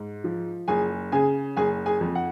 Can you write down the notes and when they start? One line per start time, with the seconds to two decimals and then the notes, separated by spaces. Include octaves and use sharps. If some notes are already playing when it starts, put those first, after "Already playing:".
Already playing: G#2
0.24 F3
0.68 F#1 G#4 G#5
1.12 C#3 G#4 G#5
1.56 F#1 G#4 G#5
1.86 G#4 G#5
2.01 F2
2.15 F#5